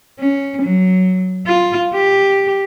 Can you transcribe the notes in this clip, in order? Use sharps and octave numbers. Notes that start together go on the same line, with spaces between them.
C#4
F#3
F4
G4